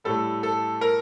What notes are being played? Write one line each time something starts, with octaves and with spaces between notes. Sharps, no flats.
A2 G3 A4
A4
A#4